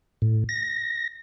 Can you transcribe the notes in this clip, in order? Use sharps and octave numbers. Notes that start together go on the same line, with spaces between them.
A2
A#6